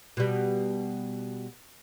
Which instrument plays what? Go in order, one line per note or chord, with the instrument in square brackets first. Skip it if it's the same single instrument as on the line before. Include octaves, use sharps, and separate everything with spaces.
[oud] B2 G3